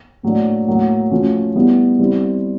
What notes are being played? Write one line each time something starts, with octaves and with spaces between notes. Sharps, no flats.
A2 F#3 A#3 D4
A2 F#3 A#3
F3 A3 C#4 F#4
G3 B3 E4
G3 C4 E4